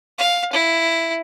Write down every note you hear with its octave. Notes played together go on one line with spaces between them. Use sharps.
F5
E4